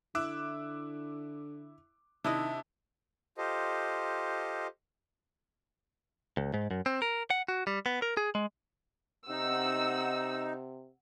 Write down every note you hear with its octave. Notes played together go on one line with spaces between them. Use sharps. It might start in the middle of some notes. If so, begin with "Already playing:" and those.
D3 E4 D6 E6 F#6
C3 D#3 D4 E4 D#5
F4 G4 A4 C5 D#5
C#2
G#2
F#2
C4
A#4
F#5
F#4
G3
B3
A#4
G#4
G#3
C3 D#4 F#5 E6